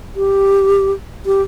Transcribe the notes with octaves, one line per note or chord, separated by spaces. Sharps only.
G4
G4